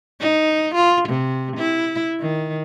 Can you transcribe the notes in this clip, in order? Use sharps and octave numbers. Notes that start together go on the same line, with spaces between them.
D#4
F4
C3
E4
D#3